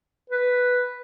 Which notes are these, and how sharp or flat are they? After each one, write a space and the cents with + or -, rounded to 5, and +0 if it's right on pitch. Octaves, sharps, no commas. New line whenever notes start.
B4 +0